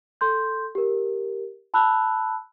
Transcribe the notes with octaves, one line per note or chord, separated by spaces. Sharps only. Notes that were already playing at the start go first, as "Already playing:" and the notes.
A4 C6 G6
G4 A#4
A5 B5 E6 F#6